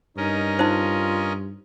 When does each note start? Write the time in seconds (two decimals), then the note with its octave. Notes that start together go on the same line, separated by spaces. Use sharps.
0.17 G2 C#4 D#4 A#4 D#5
0.59 D#4 F4 C5